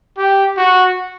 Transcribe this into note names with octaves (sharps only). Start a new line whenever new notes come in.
G4
F#4